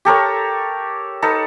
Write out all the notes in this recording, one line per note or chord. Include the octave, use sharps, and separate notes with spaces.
G4 A4 A#4 C#5
D#4 A4 B4